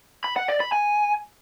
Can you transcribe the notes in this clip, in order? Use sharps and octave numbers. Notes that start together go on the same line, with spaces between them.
B5
F#5
D5
B5
G#5